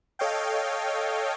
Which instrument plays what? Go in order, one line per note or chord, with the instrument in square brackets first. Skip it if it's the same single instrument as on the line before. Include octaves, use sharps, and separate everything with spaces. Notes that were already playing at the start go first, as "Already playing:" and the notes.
[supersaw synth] A4 C#5 D#5 F5 G5